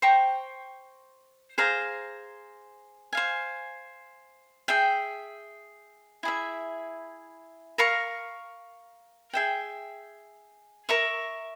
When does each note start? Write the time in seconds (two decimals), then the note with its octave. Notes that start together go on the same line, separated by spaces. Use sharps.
0.02 C5 G5 A#5 C#6
1.58 G#4 C5 F5 A#5
3.13 C5 F5 G#5
4.68 G#4 E5 G5
6.23 E4 G#4 E5
7.78 A#4 F5 A#5 C#6
9.33 G#4 E5 G5
10.89 A#4 E5 A#5 C#6